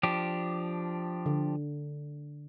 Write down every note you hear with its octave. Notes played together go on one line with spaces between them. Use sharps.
F3 D4 G4
D3